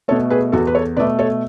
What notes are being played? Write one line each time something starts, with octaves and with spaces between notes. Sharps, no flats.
B2 A3 A4 C#5
G#4 B4
E2 F#4 A4
B4
A4 C#5
B2 A3 B4 D5
A4 C#5